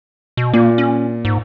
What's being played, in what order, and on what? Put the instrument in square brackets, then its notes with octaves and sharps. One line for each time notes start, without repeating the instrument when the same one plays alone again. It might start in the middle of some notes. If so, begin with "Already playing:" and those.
[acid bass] B2
[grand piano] A#2 [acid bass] A#3
[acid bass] C#4
G#2